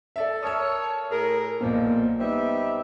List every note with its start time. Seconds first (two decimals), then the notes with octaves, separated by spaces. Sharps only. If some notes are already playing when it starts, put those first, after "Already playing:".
0.16 A4 D5 E5
0.43 A4 A#4 C#5 D#6 E6
1.10 A2 G#4 A#4
1.61 B1 A#2 F3 A#3
2.19 G3 B3 C4 D#4 E5